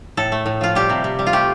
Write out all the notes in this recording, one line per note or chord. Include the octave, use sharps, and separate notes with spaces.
A2 A4
A3
A2
F3 F4
G3 G4
C3
C3
G3
F4
A3 G4